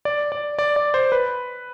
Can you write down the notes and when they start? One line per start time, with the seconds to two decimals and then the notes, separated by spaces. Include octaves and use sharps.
0.05 D5
0.32 D5
0.59 D5
0.76 D5
0.94 C5
1.12 B4